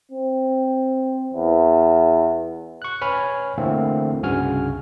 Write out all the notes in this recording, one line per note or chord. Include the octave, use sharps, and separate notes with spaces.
C4
E2
C#6 F#6
B4 C#5 G#5 B5 F6
D3 E3 A3 A#3 C4
C2 G2 C#3 F#4 G#5 F6